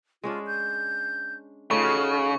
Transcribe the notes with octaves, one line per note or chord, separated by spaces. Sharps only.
G#3 C#4 D4 F4
G6
C#3 A3 D#4 F4 F5 C#6
F#4 F6